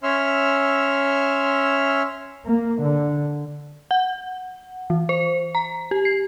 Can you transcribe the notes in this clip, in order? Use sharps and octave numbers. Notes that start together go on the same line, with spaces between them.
C#4 C#5 E5 C6 E6 F6
A#3
D3
F#5
E3
C5
A#5
G4
C7